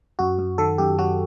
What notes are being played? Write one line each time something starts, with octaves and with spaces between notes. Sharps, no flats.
F#2 F#4
F#2
D#3 A4
F#2 G4
F#3 F#4